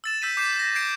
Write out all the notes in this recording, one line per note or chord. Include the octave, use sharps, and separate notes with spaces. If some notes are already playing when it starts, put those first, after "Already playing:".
E6 A6 E7
E6 G6 B6 D#7
D6 G6 C7 E7
G6 A#6
G6 G#6 C7 D7